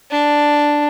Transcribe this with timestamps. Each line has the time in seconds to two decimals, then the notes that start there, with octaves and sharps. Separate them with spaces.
0.11 D4